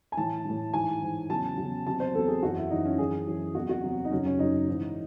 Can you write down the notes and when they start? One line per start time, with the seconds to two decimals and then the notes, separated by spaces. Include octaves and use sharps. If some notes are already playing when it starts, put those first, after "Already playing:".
0.12 G#5
0.17 A2 E3 A5
0.45 A2 E3
0.73 G#2 E3 G#5
1.02 G#2 E3
1.30 E2 C#3 F#3 A5
1.58 E2 C#3 F#3
1.87 E2 C3 F#3 A5
2.00 C5
2.14 E2 C3 F#3 A4
2.28 G#4
2.43 F#2 E3 F#4
2.57 E4
2.71 F#2 E3 D#4
2.85 C#4
2.99 F#2 E3 G#4
3.27 F#2 E3
3.55 E2 C3 F#3 F#4
3.69 F#4
3.83 E2 C3 F#3
4.05 D#4
4.11 F#2 C#3 F#3 C#4
4.26 C#4
4.39 F#2 C#3 F#3 D#4
4.68 G#2 E3